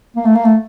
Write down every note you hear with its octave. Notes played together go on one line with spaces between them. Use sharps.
A#3
A3
A#3
A3